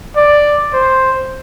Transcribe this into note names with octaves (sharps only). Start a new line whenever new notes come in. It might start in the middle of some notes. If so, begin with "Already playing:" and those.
D5
C5